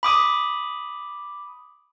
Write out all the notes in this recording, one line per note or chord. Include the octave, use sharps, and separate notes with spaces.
B5 D6 D#6